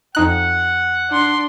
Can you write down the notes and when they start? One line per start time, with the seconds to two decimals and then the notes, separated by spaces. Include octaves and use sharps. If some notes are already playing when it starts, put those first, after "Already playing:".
0.15 F2 D#4 F#5 F#6
1.10 D4 C6